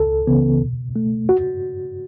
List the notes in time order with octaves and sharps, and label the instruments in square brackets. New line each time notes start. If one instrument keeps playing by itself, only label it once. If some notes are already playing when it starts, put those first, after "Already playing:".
Already playing: [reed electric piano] C#2 A4
C#3 E3 B3
B2
A3
F#4